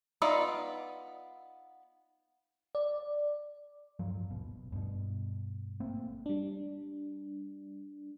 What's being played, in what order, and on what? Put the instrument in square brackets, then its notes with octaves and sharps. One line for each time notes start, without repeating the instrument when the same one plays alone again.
[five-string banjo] B3 D#4 F4 D5 E5
[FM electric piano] D5
[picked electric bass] D1 G2 F3 F#3
D#1 G#1 B2
G2 B2
G#1 A3 A#3 C4
[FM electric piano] G3 D4